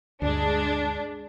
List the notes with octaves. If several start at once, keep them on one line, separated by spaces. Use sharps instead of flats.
D2 G2 G#3 D4